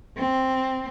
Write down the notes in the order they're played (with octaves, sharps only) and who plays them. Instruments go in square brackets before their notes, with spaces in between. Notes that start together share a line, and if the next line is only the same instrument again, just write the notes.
[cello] C4